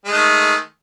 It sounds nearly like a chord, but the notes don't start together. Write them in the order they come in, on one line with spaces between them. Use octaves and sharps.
G#3 A3 D#3